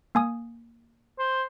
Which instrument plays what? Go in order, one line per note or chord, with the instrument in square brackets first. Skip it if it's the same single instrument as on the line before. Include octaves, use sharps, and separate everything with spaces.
[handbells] A#3 G#5 D#6
[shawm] C5